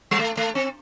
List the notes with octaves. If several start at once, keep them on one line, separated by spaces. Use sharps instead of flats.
G3
A3
A3
C4